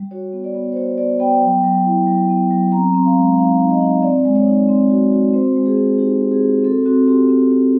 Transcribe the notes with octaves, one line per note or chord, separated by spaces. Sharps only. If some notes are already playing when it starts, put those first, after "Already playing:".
Already playing: G3
F#4 C#5
B3
D5
B3
C5
F#4 C#5
B3 D5
B3 G5
F#3
F#3
E4
F#3
B3
F#3
C4 A#5
C4
F5
G#3
D#4 F5
D#4
D#5
D#4
C4 D5
G#3
C#5
D#4
C4
F#4
F#4
C4 C5
G#3
G#4
C4
D#4 G4
C4
G#4
F#4
C4 A4
C4 F#4
C4 G4
C4
C4